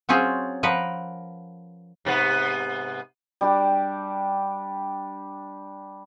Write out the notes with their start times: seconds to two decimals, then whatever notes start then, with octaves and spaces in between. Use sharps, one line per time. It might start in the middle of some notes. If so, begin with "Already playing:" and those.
0.09 F#3 C4 C#4 F4 G#4
0.63 F3 A#4 B4 F#5
2.05 G#2 C3 B3
3.41 G3 D4 G4